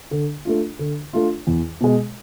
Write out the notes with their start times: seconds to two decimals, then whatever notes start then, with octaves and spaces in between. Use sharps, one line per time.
0.11 D3
0.45 A3 D4 F4
0.79 D3
1.13 A3 D4 F4
1.47 E2
1.81 B2 G#3